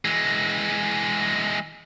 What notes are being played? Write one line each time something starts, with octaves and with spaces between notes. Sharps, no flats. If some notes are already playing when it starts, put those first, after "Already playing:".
E3 G#3